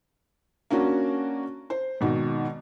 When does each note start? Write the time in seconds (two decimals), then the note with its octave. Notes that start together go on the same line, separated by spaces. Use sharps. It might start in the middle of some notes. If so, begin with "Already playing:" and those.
0.70 A#3 C#4 D4 F#4
1.70 C5
2.01 G#1 B2 D#3